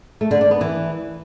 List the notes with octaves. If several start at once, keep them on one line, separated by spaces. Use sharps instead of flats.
A3
D3
D4
B3
E3